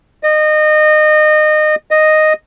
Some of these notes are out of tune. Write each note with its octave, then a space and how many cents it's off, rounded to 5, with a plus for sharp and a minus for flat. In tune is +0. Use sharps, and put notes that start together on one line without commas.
D#5 -25
D#5 -5